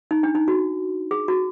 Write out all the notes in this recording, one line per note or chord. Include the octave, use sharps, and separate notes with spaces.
D#4
D4
D#4
F#4
G#4
F#4